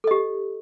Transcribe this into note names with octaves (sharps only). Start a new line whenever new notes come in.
G4 A4 D#5